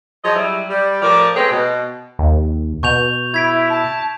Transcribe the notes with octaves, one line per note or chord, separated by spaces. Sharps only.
F3 F#3 G#4 C#5 D#5
F#3 G3 E4
G3
A2 F3 A#4 D5
G#3 A3 B3 C4 G#4 C#5
B2
D#2
B2 C#6 G6 F7
E4 G#6 B6 D7
A5